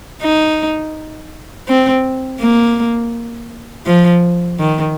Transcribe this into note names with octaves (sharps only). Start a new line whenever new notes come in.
D#4
C4
A#3
F3
D#3